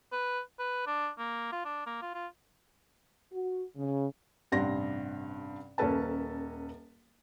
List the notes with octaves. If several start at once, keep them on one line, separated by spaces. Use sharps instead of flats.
B4
B4
D4
A#3
F4
D4
A#3
F4
F4
F#4
C#3
A1 G2 C3 F#5 C6 A#6
D#1 A#3 C#4 A4 B4 A5